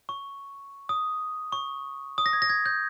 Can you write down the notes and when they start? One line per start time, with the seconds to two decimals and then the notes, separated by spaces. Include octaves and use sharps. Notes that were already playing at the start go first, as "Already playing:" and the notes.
0.09 C#6
0.89 D#6
1.52 C#6
2.18 D#6
2.26 A#6
2.33 G#6
2.42 A#6
2.50 G#6
2.66 G6